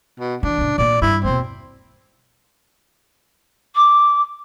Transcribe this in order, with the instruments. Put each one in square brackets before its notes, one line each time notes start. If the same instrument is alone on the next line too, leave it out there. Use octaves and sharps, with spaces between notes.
[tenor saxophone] B2
[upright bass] E3 [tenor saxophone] D4
[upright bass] A2 C#3
[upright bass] A#2 A#3 [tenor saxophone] D5
[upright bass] G2 [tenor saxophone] E4
[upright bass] D#2 B2 [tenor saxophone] C4
[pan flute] D6